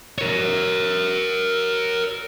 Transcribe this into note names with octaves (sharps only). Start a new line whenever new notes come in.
A#4 C#5